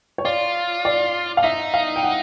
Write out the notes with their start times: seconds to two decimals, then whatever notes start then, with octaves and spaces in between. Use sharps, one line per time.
0.18 C#5
0.25 F4 D5
0.85 D5
1.37 F5
1.43 D#4 E5
1.74 F5
1.96 G5
2.03 F#5